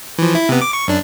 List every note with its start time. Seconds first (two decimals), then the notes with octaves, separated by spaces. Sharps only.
0.18 E3 F3
0.35 E4
0.49 C3 B3
0.62 D6
0.73 C#6
0.88 F#2 D4